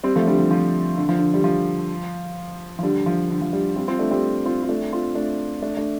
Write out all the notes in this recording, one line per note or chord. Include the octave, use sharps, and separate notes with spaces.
G3 C4
F3 A3
D3 G3
F3
F3
D3
F3
D3
G3
F3
F3
D3 G3
F3
D3
F3
D3 G3
G3 C4
C4 F4
A3 D4
G3 C4
C4 F4
F4
A3 D4
C4 F4
A3 D4
A3 D4
A3 D4